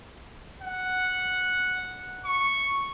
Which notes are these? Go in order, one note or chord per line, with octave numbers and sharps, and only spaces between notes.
F#5
C#6